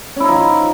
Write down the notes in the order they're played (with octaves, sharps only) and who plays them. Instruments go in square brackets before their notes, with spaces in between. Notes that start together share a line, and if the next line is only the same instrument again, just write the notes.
[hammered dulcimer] C#4
E4
D#4
F3